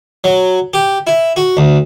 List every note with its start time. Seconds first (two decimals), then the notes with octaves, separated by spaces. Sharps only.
0.24 F#3
0.74 G4
1.07 E4
1.36 F#4
1.57 D2